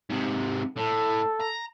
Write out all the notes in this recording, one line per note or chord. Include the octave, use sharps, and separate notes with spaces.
G#2 C3
A2 A4
A#5